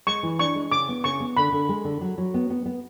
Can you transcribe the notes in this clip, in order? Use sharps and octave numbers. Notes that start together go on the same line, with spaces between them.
G#3 C#6
E3
D4 C#6
G#3
C#3 D6
B3
C#3 C#6
B3
D3 B5
D3
G#3
D3
F#3
F#3
B3
B3
B3